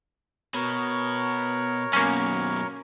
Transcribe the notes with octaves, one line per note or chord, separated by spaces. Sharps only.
B2 A#4 C#5
F#2 B2 A#3 C#4